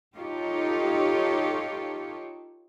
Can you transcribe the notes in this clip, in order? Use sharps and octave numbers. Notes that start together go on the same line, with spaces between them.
D#4 F4 G4 A4 C#5